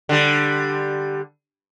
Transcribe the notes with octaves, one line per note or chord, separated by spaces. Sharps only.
D3 G3